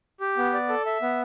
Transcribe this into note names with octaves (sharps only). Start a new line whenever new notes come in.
G4
B3
D5
A4
E5
B3